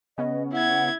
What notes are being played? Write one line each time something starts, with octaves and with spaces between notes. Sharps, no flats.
C#3 B3 C#4 D#5
E4 F#5 G#6